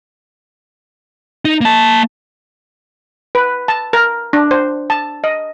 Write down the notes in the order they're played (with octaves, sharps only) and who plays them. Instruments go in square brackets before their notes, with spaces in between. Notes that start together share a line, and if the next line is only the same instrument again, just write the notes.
[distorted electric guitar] D#4
A#3 A5
[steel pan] B4
A5
A#4
D4
C5
A5
D#5